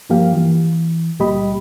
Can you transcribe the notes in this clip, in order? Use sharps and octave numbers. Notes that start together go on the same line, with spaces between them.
G2 F3 A#3 G4 F5
E3
C#2 A#2 G3 G4 D#5 B5